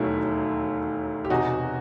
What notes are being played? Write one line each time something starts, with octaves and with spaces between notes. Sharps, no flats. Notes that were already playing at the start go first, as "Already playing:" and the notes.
Already playing: E1 D#2 D#3 F#3 A3 E4
G4
E1 E2 C3 D#4 F#4